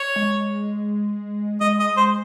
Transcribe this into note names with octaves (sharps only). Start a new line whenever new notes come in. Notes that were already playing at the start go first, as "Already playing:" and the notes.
Already playing: C#5
G#3
G#3 D#5
D#5
C5